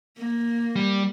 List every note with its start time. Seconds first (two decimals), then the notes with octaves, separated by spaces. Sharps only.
0.18 A#3
0.76 G3